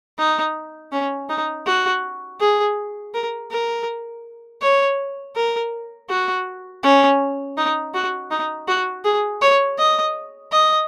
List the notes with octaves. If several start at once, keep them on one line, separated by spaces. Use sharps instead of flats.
D#4
C#4
D#4
F#4
G#4
A#4
A#4
C#5
A#4
F#4
C#4
D#4
F#4
D#4
F#4
G#4
C#5
D#5
D#5